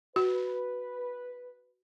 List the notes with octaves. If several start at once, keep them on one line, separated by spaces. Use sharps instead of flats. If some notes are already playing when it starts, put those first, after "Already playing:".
F#4 B4